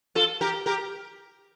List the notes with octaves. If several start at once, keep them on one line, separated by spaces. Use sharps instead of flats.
F4 A4
G4 A#4
G4 A#4